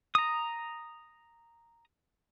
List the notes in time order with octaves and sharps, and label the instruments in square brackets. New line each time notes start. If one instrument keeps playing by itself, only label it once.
[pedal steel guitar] A#5 D#6